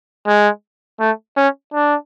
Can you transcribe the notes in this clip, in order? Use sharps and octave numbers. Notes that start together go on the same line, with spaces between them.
G#3
A3
C#4
D4